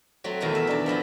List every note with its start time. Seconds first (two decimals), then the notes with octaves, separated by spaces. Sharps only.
0.24 F#3 A3 C4
0.40 E2 B2 D#3 A4 A#5
0.55 E5
0.67 D4 A4
0.86 F3 E4 A4 D#5